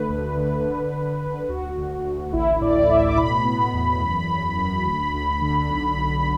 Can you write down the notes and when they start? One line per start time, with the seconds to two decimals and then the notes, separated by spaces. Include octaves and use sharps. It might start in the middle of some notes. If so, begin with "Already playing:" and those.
Already playing: D3 A3 B4
0.09 D2
0.37 D3
0.64 D3
0.92 D3
1.21 D3
1.49 D2 F#4
1.77 D2
2.05 D2
2.33 A1 E4
2.61 A2 D5
2.79 D5
2.89 A2 E5
3.08 D6
3.17 B2 B5
3.45 B3
3.74 E2
4.02 F#2
4.29 F#2
4.57 F#2
4.85 D2
5.14 D2
5.41 D3
5.69 B1
5.97 B1